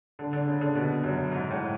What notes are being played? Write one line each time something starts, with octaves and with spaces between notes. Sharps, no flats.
D3
D3
C#3
D3
B2
F#2
G#2
A2